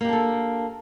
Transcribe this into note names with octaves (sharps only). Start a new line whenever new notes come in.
A#3 D4 G4 A4